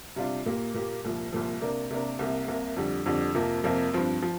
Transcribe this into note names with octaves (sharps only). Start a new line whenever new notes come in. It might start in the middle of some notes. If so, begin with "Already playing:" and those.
C3 G3 D4 F4
A#2 A#3 G4
A#2 A#3 G4
C2 A#2 F3
C2 A#2 F3
C3 A#3 D4 A#4
C3 A#3 D4 A#4
C2 C3 A#3
C2 C3 A#3
F2 D3 G3
F2 D3 G3
F2 C3 F3 A#3
F2 C3 F3 A#3
G2 F3 C4
F3